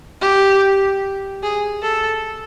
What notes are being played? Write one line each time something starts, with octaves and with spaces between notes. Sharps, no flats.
G4
G#4
A4